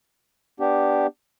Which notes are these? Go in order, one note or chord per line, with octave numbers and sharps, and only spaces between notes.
B3 D4 G4